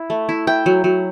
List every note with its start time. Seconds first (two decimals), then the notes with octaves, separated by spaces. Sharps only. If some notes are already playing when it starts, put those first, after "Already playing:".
Already playing: E4
0.10 A3
0.29 E4
0.47 E4 G5
0.66 F#3
0.84 F#3